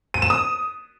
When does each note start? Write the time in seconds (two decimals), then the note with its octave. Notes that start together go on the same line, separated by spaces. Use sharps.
0.14 D#7
0.22 E7
0.30 D#6